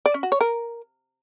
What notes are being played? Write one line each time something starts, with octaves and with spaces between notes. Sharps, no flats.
D5
C#4
F#4
C#5
A#4